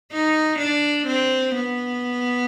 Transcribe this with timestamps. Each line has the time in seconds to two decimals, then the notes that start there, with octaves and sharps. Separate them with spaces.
0.12 D#4
0.59 D4
1.07 C4
1.55 B3